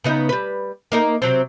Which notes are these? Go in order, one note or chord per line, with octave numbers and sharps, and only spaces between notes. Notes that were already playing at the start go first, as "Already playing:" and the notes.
C#3 B3 D#4
G3 B4
A#3 D#4 A#4
C3 F#3 C4